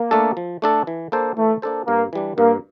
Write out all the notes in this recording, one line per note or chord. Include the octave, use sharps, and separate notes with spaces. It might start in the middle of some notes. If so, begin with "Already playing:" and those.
Already playing: A#3
A3 D4 A4
F3
A3 D4 A4
E3
A#3 D4 A4 C5
E3 A3
A#3 D4 A4 C5
G2 A#3
E3 G3 D4
G2 A#3